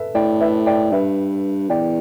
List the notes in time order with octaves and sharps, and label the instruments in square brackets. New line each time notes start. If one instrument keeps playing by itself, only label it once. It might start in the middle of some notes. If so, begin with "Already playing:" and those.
Already playing: [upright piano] A4 B4 E5
[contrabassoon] A2 [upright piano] D5 G5
[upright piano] B4 E5
D5 G5
[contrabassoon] G2 [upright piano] B4 E5
[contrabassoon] E2 [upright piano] D5 G5